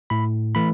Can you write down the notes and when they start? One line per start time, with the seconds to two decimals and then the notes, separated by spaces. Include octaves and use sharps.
0.10 A2 B5
0.55 E3 A3 B5